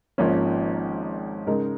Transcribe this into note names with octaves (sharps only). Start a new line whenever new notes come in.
G#1 G#2 F3 A#3 C#4
C#3 G#3 D#4 A#4